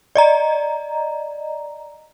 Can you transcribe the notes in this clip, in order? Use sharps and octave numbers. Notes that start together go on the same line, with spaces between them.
D5 D#5 A#5